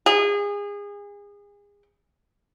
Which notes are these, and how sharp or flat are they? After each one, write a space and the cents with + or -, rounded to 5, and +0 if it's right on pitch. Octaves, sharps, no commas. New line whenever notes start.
G#4 -30